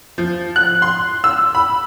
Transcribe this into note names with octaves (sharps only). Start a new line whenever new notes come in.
F3
F#6
C6
E6
B5